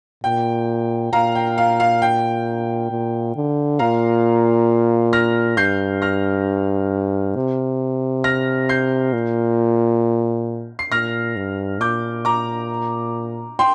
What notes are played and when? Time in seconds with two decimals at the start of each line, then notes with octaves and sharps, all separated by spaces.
0.24 A#2 G5
1.13 A#2 F5 A#5
1.35 G5
1.58 F5
1.80 F5
2.02 G5
2.91 A#2
3.36 D3
3.79 A#2 F5 A#5
5.13 F6 A#6
5.57 G2 G6 C7
6.02 F6 A#6
7.36 C3
8.24 F6 A#6
8.69 G6 C7
9.13 A#2
10.79 C7
10.92 A#2 F6 A#6
11.36 G2
11.80 A#2 D6 G6
12.25 A#5 D6
13.59 G5 C6